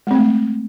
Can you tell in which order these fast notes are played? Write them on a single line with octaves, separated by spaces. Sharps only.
G#3 C4 A3